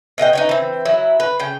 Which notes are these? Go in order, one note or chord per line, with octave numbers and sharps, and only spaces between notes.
B2 D#5 F#5 G5
D#4 B4 C#5
E3 C4
F#3 E4
B4
C#3 G5